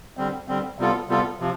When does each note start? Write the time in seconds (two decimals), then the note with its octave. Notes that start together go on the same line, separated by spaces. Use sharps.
0.17 D3 G3 C4
0.48 D3 G3 C4
0.78 C3 G3 B3 F4 A4
1.08 C3 G3 B3 F4 A4
1.39 C3 F3